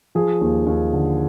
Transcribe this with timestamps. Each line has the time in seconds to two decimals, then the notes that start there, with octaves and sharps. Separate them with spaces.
0.15 F3 G#4
0.41 D#2
0.67 D#2
0.93 D3